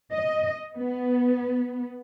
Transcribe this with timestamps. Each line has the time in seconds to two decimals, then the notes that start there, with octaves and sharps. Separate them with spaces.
0.13 D#5
0.76 B3